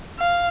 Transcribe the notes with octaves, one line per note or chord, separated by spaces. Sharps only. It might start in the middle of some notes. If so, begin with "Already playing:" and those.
F5